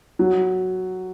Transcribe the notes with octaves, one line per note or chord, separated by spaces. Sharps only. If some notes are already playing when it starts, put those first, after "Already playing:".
F#3